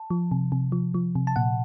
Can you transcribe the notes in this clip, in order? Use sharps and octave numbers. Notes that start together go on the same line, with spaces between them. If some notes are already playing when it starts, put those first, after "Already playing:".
Already playing: A5
F3
C3
C3
F3
F3
C3
A5
A#2 F#5